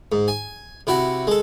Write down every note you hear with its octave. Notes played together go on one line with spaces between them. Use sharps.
G#2
G#5
C3 E4 F#4 F#5
G#3 A4